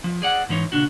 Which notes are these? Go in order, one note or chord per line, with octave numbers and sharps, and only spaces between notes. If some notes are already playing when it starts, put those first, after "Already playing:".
F3
G#4 D5 F#5
G#2 E3 D#4 C#5
A#2 C#3 D4 F#4